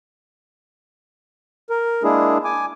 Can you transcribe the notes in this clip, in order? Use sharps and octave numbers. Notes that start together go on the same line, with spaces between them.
A#4
G#3 A#3 D4 E4 G#4
G#5 D6